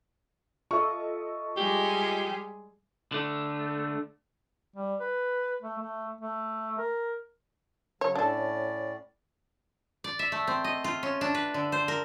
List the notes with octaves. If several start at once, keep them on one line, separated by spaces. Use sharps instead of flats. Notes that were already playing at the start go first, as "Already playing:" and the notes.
F4 A4 D#5 E5 C#6
G3 G#3 G4 G#4
D3 A3
G3
B4
A3
A3
A3
A#4
C#3 F#3 C#5
A2 C#4 D4 A4 D5
D5
E5
A3
C4
D#5
F4
C#4
D4
B4
D3
C5
A#4